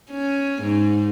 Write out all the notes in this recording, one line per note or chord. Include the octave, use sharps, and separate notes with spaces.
C#4
G#2